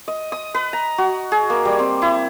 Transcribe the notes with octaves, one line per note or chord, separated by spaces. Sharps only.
D#5
D#6
B4
A#5
F#4
G#4
A#3
G3
C4
E4